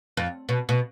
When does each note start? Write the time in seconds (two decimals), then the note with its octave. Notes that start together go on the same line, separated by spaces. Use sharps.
0.17 F2
0.49 B2
0.69 B2